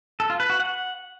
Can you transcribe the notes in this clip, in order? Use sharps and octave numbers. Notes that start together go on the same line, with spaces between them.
A4
F4
B4
F#4
F#5